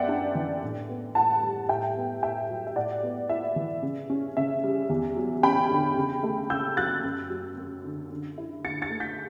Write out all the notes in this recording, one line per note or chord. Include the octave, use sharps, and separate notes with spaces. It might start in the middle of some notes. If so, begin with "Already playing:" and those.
Already playing: F#2 B3 D5 E5 F#5 G5
D4
E3
A2
B3
A2 F#5 A5
G3
A2 E5 G5
B3
A2 E5 G5
F#3
E5
A2 D5 F#5
B3
E4 E5
E3
C#3
C#4
C#3 E5
G3
E2
F#3
C#4 G5 B5
D3
C#3
A3
C#3 E6 G6
F#3 F#6 A6
F#2
F#3
F#2
D3
D3
E4
D3 A6 C#7
A6 C#7
A3
G6 B6